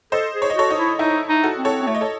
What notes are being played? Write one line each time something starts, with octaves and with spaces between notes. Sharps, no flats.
A4 C5 D#5
G#4
C#5
D#5
F#4 A4 C#5
D#4
E4
D#4 E4
D#4
F#4 A4
C4
A4 C#5
C4
A3 C#5
D#5
A4 C#5